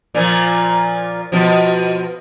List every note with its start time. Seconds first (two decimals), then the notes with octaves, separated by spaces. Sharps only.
0.15 A#2 F3
1.32 B2 F3